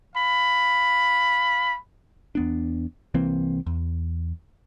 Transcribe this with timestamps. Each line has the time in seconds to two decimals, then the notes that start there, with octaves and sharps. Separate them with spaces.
0.16 F5 B5
2.35 E2 B3 D4
3.14 C2 E3 A#3 C4
3.66 E2